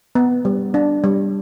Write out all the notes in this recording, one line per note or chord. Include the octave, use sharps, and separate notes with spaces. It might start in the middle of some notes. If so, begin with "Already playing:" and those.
B3
G3
D4
G3